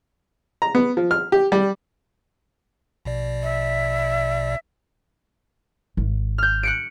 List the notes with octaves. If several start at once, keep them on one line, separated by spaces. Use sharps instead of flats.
A#5
B3
F3
F6
G4
G3
A#1 B2 D5
E5
G#1
F6 G6
F#6 C#7 D7